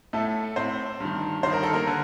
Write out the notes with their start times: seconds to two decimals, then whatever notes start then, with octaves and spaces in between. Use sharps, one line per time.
0.13 A2 A3 A4
0.56 A2 C4 C5
1.00 G2 D#3
1.43 G2 D#3 C5
1.53 A#4
1.63 A4
1.73 A#3 A#4
1.87 D3